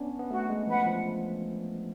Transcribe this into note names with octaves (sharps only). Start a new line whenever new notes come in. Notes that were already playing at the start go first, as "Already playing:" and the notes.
Already playing: B3 C#4 D4
B3
A3 F#4
G#3
F3 B4 F#5
F3